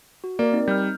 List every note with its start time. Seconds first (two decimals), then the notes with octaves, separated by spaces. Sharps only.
0.24 F#4
0.39 A#3 A#4 D5
0.52 C4 D#4
0.68 G3 F6 G6